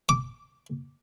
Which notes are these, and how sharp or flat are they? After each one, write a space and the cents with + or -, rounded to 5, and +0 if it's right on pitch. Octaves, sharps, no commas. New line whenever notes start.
D6 -10